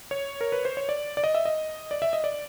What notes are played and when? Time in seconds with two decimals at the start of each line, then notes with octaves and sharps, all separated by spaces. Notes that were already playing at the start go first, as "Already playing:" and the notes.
0.11 C#5
0.41 A#4
0.52 B4
0.65 C5
0.77 C#5
0.89 D5
1.17 D5
1.24 D#5
1.35 E5
1.45 D#5
1.91 D5
2.02 E5
2.13 D#5
2.24 D5